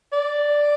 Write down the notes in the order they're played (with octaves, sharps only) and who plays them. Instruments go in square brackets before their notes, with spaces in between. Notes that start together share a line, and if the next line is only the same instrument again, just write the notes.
[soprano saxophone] D5